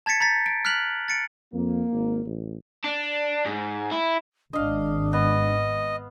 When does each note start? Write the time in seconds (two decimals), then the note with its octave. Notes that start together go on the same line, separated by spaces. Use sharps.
0.06 A5 G#6 A6 B6 C#7
0.20 A#5 G6 A6 B6
0.46 D7
0.65 F6 F#6 B6 F7 F#7
1.08 A6 C#7 D7
1.53 F2 A#3
1.93 G#1
2.26 A1
2.84 D4
3.46 G#2
3.91 E4
4.53 G#1 D4 D#5 F5
5.13 B3 D#5